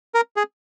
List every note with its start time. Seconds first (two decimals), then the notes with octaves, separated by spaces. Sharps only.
0.14 A#4
0.36 G#4